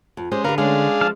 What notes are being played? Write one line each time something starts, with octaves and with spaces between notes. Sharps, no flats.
F2
G#3 C#4 G4 C5
D3 G4 A#4 B4 F5
G#3 A3 C#4 D4 G#4 F5
F3 A5 F6